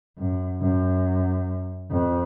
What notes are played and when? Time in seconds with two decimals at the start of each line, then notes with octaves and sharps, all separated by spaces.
0.18 F#2
0.61 F#2
1.90 F2